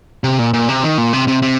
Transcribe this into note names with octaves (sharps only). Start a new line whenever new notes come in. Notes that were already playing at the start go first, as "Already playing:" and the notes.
C3
A#2
A#2
C3
D#3
A#2
C3
C3
C3